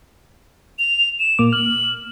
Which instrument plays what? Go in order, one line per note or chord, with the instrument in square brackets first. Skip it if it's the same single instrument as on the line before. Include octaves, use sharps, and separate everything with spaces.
[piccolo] F7
E7
[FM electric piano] A#2 A#3 D6
[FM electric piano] F6 [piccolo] F#7